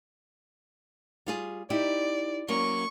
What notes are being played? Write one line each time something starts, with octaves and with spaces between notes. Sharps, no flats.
G3 F4 G#4
D#4 E4 G4 D5
F#3 A#3 C#4 C#6